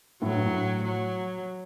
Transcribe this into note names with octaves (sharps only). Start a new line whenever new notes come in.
A2 F#3
G2
A2
F#3